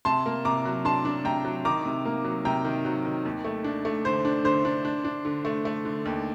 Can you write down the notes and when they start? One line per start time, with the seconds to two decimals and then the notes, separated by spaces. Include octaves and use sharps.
0.05 C3 A5 C6
0.26 A#3
0.45 C3 A#5 D6
0.65 F#3
0.85 D4 A5 C6
1.05 D4
1.25 C3 G5 A#5
1.45 F#3
1.65 D#3 A#5 D6
1.85 C3
2.05 A#3
2.24 F#3
2.45 C3 G5 A#5
2.65 D#3
2.85 F#3
3.05 D#3
3.25 D#2
3.45 A3
3.64 D4
3.85 A3
4.05 D3 C5
4.25 D4
4.44 D3 C5
4.65 D4
4.85 D4
5.05 D4
5.25 D3
5.45 A3
5.65 A3
5.85 D3
6.05 D#2